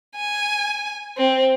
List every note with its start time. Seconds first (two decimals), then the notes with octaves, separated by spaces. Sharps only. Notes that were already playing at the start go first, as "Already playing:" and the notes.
0.17 G#5
1.17 C4